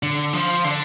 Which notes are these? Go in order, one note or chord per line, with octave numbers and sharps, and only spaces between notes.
D3
F3
D3